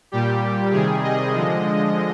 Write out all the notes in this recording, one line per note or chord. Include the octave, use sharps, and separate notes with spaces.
A#2 G3 G4
C3 D#3 G3 G#4
D#5
D3 F3 G#3